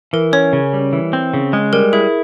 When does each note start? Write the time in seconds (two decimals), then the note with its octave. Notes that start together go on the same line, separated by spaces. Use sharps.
0.13 E3 A#4
0.33 C#4 C#5
0.53 C#3
0.73 G3
0.93 E3
1.13 C4
1.34 C#3
1.53 G#3
1.73 G3 A#4
1.93 E4 G#4